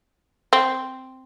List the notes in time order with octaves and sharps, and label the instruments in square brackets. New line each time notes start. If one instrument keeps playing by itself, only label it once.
[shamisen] C4